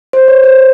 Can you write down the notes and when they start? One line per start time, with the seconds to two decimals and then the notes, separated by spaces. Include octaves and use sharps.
0.13 C5
0.28 C#5
0.44 C5
0.58 C5